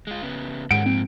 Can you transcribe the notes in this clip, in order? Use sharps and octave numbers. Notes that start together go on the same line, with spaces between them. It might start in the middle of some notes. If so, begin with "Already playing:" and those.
G#3 F4
C#3 B3
G#2 D#3 C#4 F#5 D7
A#2 F3 C4